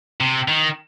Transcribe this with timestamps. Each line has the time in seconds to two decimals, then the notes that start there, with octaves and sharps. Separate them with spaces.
0.20 C3
0.48 D#3